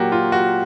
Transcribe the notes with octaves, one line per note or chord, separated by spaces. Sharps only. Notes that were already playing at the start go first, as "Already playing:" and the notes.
Already playing: A#2 F#3 A#3 F#4 G4
F4
F#4